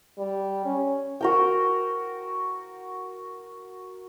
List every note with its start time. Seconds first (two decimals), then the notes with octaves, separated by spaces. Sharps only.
0.18 G3
0.65 C#4
1.21 F#4 A#4 G5